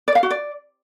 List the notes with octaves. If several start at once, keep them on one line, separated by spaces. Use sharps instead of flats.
D5
F5
F#4
D5